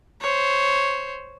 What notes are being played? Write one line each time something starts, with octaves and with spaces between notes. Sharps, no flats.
C5 C#5